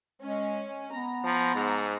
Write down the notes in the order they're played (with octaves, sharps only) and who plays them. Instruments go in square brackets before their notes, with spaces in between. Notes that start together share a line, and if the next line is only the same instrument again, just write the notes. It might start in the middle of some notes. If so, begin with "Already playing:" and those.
[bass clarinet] G#3 [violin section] C#4
[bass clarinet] B3 [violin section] A#5
[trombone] F3 [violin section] A#5
[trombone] G#2